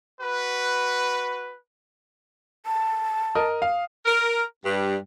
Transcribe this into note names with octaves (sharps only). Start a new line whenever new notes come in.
F#4 B4
A5
A#4 D#5 D#6
F5
A#4
G2